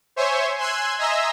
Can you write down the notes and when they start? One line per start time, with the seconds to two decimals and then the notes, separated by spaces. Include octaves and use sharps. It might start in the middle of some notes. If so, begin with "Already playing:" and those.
0.16 C5 C#5 E5 G#5 C6 C#6
0.58 G#5 C6 E6 F#6 G#6
0.98 D#5 E5 G#5 A#5 C6 E6